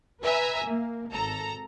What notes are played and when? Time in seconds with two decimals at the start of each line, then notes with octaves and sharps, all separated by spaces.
0.22 B4 E5 G#5 A#5
0.64 A#3
1.10 G#1 A4 A#5